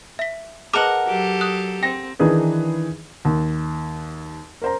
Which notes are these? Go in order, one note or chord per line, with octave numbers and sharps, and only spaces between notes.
E5 B6
G#4 A#4 B4 D#5 F#5 A5 D6
F#3 G4 A4
D#6 F#6
C4 G5 A#6
D#3 E3 D4 D#4 G#4 B4
D#2
A#4 C5 A#5